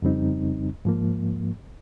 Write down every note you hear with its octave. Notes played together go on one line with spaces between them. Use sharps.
F2 C#3 G3 C4 D#4
G#2 F3 A#3